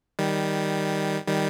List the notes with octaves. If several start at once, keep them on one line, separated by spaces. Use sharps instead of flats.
D#3 G3
D#3 G3